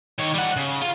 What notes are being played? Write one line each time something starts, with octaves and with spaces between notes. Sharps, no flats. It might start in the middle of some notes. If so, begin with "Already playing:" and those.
D#3 C#5
G3 F#5
C#3
F4